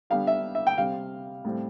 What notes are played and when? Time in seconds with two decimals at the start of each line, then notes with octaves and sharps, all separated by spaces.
0.10 D3 G3 B3 F5
0.27 E5
0.55 E5
0.67 G5
0.78 C3 G3 C4 F5
1.45 A2 G3 C4